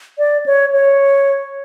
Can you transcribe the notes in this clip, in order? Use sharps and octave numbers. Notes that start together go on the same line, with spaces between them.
D5
C#5
C#5